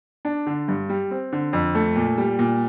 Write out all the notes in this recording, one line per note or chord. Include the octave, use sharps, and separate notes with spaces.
D4
D3
G2
G3
C4
D3
F2
A3
A#2
G3
A#2